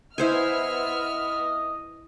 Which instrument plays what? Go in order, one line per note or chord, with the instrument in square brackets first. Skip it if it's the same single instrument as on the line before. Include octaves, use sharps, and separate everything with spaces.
[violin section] B3 E5 F6 [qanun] E4 C5 G#5 [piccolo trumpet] D#5